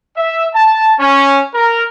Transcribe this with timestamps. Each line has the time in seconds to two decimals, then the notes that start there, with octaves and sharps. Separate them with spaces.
0.17 E5
0.54 A5
1.00 C#4
1.54 A#4